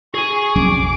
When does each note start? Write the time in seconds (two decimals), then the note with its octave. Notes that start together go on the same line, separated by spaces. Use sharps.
0.14 G#4 G#5 C#6
0.56 A#1 F2 C3 F#3 C#4 D6